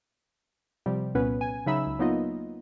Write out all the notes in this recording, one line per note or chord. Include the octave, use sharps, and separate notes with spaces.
C3 F3 G3
C2 A#2 B3 C#4 B4
G#5
C#3 F#3 D#4 E5 B5 E6
C#2
F#3 A#3 B3 D#4 F4 D#5